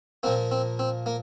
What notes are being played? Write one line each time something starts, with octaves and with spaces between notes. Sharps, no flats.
A#2 F3 A#3 C4
C4
C4
A#3